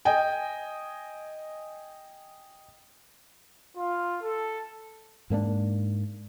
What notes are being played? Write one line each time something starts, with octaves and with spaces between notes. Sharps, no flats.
D#5 G5 G#5
F4
A4
G#2 A#3 C#4 D4